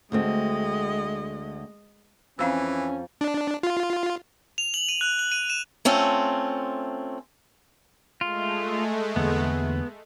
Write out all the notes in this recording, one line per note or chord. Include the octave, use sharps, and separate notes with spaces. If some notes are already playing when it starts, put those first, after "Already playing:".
D2 D3 G#3 C4 D#5
F2 E3 C4 C#4 F5 E6
D4
F4
F7
F#7
D#7
F#6
F#7
D#7
E7
A3 C4 C#4 F4
G#3 A3 F4
E2 D3 A#3 B3